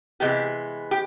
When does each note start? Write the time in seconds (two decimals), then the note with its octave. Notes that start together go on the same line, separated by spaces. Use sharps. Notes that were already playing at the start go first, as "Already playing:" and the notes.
0.20 C3 E3 G#3 B3 G4
0.91 G4